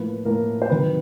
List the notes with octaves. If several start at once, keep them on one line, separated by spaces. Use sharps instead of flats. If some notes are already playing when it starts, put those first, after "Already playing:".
Already playing: A2 F3 A#3 B4
A2 F3 A#3 A#4
C5
C3 D#3 F#3 B4